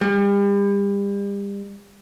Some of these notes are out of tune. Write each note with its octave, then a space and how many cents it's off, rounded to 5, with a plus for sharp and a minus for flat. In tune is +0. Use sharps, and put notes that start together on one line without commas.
G3 +35